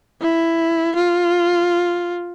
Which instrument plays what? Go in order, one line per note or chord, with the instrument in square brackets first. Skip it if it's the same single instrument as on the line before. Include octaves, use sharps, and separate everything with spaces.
[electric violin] E4
F4